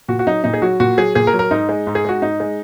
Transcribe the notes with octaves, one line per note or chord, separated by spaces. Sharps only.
A#2 F#4
F#4
F#3 D#4
A#2 D#4
G#4
F#3 F#4
A#2 F#4
F#3 G#4
A#2 G#4
A#4
F#3
A#4
G#2 D#4
G#3
G#2
G#4
G#3 F#4
G#2 D#4
G#3